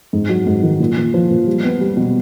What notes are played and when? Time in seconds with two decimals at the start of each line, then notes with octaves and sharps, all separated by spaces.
0.13 G#2
0.29 F#3
0.47 G#2
0.63 D#3
0.80 A#2
0.97 A#2
1.14 F3
1.30 A#2
1.47 G3
1.64 B3
1.81 G3
1.97 B2